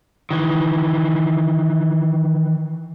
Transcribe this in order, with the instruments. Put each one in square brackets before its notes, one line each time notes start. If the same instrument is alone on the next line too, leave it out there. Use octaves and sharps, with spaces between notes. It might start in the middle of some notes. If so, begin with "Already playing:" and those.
[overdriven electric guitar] D#3 E3